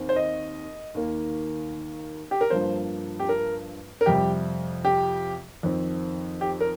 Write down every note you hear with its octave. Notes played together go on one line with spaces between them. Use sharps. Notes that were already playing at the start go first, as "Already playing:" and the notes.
Already playing: D#2 D#3 C4
C5
D#5
D#2 D#3 A#3
G4
A#4
G2 F3 A#3 C5
G4
A#4
A#4
F2 C3 G3 G4
G4
F2 D#3 C4
G4
A#4